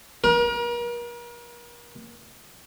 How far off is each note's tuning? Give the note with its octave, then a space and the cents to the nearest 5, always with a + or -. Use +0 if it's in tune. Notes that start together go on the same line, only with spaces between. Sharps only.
A#4 +40